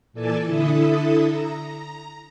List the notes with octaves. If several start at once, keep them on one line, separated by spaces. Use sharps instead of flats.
A#2 E3 A4 D5 G#5 A5
D3 E4 A4 E5 D#6
A#5